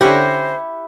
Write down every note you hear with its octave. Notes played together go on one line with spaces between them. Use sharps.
D3 C#4 E4 G4 C5 F#5 A#6